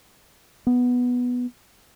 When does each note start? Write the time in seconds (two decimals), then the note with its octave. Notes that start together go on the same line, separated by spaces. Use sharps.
0.67 B3